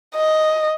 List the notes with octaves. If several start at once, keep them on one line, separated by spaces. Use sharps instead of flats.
D#5